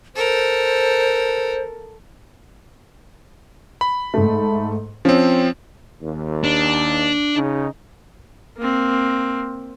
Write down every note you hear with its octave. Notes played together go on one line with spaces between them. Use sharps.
A4 A#4 C5
B5
G#2 A3
F3 C4 C#4
D#2
D4
C#3 D#4
A#3 C4